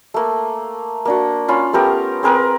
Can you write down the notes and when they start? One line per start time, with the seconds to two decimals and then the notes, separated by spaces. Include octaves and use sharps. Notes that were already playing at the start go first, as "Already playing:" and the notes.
0.14 A3 A#3
1.05 A#3 D4 F#4
1.48 C#4 F4 B5
1.73 A3 B3 G4 A#4
2.23 C4 G#4 A#4 B4